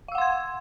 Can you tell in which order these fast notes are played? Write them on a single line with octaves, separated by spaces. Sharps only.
F5 E6 F#5 C6 G#6